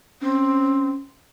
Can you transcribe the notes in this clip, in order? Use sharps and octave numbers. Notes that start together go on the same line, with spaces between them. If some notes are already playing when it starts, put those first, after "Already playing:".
C4 C#4